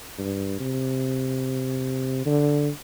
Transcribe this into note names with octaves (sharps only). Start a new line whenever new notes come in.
G2
C3
D3